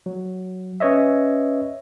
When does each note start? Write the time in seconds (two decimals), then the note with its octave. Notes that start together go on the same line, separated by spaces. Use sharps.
0.06 F#3
0.80 C#4 B4 C#5 D#5 E5